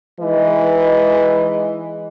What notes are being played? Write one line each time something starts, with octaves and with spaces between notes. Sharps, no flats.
E3 G#3 D#4 B4 D#5